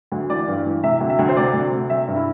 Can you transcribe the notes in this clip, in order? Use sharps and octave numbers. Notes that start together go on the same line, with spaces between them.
D2
E3 D5
G2
E3
C3 E5
D2
E5
D2
C5
C3 D5
D2
C3
G3 E5
G2
E4